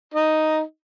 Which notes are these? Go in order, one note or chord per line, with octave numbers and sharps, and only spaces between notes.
D#4 D#5